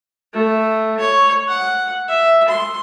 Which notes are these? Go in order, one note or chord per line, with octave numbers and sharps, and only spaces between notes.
A3
C#5
F#5
E5
C6